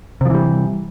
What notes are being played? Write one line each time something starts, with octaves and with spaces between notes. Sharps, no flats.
C3 E3 F3 G3